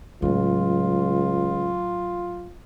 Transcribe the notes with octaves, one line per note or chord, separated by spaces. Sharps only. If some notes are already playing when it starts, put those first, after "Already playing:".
C#2 A2 F#3 F4